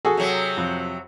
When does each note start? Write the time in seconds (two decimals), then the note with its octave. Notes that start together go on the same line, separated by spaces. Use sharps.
0.05 F#4 G#4 A4
0.17 C3 F#3
0.57 F2